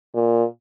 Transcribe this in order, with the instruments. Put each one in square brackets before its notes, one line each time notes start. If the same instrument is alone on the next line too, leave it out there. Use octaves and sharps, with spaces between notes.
[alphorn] A#2